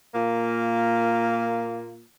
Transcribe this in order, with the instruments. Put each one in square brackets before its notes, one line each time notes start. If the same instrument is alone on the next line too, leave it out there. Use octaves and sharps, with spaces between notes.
[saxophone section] A#2 A#3 F4